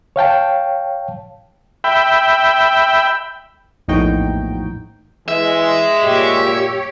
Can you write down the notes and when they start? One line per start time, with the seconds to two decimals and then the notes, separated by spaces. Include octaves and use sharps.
0.16 C#5 F5 G5 A5
1.84 E5 G5 B5
3.88 A#1 E2 A2 D#4 F#4 G5
5.28 E3 G#3 E5
6.04 A#2 G4 C#5